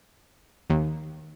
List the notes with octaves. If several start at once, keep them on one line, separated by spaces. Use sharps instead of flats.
D#2